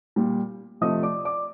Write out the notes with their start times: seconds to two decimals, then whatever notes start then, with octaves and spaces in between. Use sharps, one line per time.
0.16 A#2 G3
0.81 C3 F3 A3 D#5 D#6
1.03 D5 D6
1.25 D5 D6